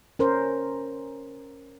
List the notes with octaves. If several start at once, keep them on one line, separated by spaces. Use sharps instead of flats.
C#4 A#4 C5